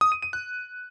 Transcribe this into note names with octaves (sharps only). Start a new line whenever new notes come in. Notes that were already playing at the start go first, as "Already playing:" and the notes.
D#6
D#7
D#7
F#6